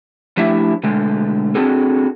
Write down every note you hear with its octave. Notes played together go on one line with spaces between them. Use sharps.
F3 A3 D4 E4 G4 E5
B2 D3 G#3 A3
C4 D4 F#4 G#4 A4